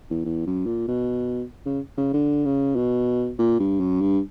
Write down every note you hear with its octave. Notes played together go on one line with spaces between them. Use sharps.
E2
E2
F#2
A#2
B2
C#3
C#3
D3
C#3
B2
A#2
G2
F#2
G2